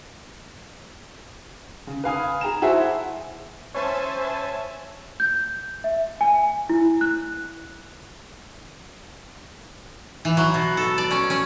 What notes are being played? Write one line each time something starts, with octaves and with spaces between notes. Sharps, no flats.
C#3
B4 F5 G#5 D#6
G#4 A#5 E7
E4 F#4 G#4 C5 E5 A5
C#4 C5 C#5 E5 G#5 A5
G6
E5
G#5
E4
F#6
E3
F#3
B2
A4
D5
C#4
C#4